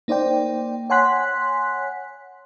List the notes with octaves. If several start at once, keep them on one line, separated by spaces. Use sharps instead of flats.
A#3 D#4 C5 D5 G5
C#5 F#5 G#5 C6 F#6 B6